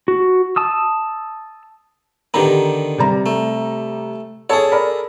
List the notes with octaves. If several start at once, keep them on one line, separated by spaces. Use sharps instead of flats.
F#4
A5 D#6 E6
D3 D#3 B3 G4 A#5
C3 G3 A#5
A3
G#4 A4 C#5 A5
A#4 D5 B5